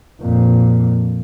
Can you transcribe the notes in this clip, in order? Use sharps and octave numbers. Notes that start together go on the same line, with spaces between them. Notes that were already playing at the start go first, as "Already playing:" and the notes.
F2 A#2